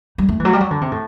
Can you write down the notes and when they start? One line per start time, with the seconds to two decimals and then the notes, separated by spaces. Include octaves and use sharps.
0.18 G3
0.29 A3
0.40 E3
0.45 F#3
0.53 G3
0.60 F#3
0.71 D3
0.81 C3
0.91 A2